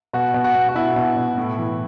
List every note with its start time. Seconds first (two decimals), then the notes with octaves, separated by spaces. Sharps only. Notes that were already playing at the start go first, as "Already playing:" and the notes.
0.13 B2 F#4
0.34 B2
0.44 F#4
0.55 B2
0.69 F#4
0.75 B2 E4
0.96 B2
1.17 B2
1.38 A2
1.58 E3